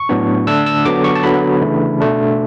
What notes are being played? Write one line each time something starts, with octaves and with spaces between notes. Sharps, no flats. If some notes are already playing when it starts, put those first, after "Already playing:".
Already playing: C#6
A2 F#3 B3 D4
D3 A3 D4 E6
E6
D3 F#3 B3 D4 D6
C#6
A5
D3 F#3 B3 B5
C#3 E3 A3 D4
B2 A3 D4